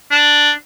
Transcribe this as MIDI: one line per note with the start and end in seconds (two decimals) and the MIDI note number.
0.11 0.51 62